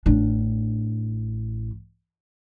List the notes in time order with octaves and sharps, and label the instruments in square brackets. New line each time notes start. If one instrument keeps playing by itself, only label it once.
[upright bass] A1 D4